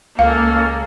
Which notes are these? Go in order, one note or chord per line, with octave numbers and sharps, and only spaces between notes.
C#2 A#3 C#4 A4 F5 F6